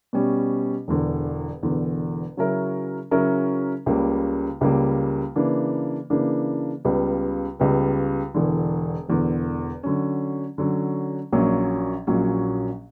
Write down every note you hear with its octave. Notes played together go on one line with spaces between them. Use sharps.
B2 G3 C#4
E1 E2 D3
E1 E2 D3
C#3 F#3 C#4 E4 A#4
C#3 F#3 C#4 E4 A#4
C#2 C#3 G3 A#3 C#4
C#2 C#3 G3 A#3 C#4
C#3 E3 A#3 D4
C#3 E3 A#3 D4
C#2 C#3 G3 B3
C#2 C#3 G3 B3
E1 E2 D3
E1 E2 D3
D3 F#3 C#4
D3 F#3 C#4
A#1 A#2 F#3 C#4
A#1 A#2 F#3 C#4